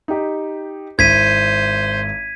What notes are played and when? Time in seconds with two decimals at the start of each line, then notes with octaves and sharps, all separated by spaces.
0.08 D#4 G4
0.99 G#1 E4 C5 G#6 B6 D#7